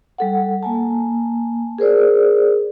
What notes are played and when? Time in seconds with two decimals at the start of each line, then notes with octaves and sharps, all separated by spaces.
0.18 G3 A4 F#5
0.63 A#3 G#5 A5
1.78 G#4 A#4 C5 D5